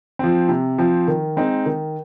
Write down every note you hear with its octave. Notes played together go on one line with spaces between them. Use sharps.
F3 C4
C3
F3 C4
D#3
G#3 C4 D#4
D#3